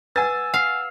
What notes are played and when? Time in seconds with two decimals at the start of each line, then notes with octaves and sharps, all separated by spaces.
0.16 B4 F#5 G#5 E6 A6
0.54 F5 F#5